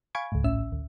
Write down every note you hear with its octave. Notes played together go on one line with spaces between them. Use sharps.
F5 G#5 B5 C#6 G#6 D7
C#2 G#2
A1 A2 C#4 E5 E6
D2